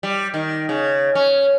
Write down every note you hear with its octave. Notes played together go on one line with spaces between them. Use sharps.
G3
D#3
C#3
C#4